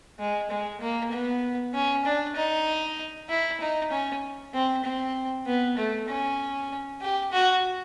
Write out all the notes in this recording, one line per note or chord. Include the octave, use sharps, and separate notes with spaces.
G#3
G#3
A#3
B3
C#4
D4
D#4
E4
D#4
C#4
C4
C4
B3
A3
C#4
G4
F#4